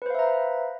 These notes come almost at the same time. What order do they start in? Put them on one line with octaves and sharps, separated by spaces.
B4 C5 F5 E5 A#5